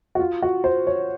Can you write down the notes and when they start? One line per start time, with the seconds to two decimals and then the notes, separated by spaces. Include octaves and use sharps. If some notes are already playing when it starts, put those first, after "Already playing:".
0.15 F#4
0.19 F4
0.42 F#4
0.64 C5
0.87 C#5